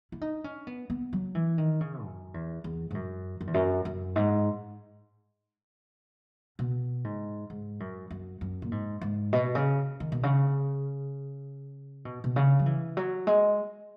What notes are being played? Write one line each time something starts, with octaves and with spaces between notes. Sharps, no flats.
E4
D#4
C#4
B3
B3
F#3
E3
D#3
C#3
F#2
E2
E2
G#2
F#2
F#2
E2
F#2
F#2
G#2
B2
G#2
G#2
F#2
F#2
F#2
A#2
G#2
G#2
B2
C#3
D#3
B2
C#3
B2
B2
C#3
F#3
E3
F#3
G#3